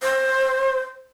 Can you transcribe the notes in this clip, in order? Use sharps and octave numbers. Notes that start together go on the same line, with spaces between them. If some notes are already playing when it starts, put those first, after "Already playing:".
C5